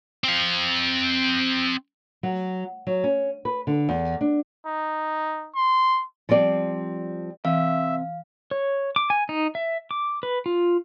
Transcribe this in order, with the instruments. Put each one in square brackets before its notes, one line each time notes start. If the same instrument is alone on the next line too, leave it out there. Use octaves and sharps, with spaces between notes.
[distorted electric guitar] C4 F5
[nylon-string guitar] F#3
F#3
C#4
B4
D3
E2
D4
[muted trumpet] D#4
C6
[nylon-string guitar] F3 G3 C4 D5
[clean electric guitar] C3 [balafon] E3 [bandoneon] E5 [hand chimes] F5
[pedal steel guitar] C#5
D6
G#5
D#4
E5
D6
B4
F4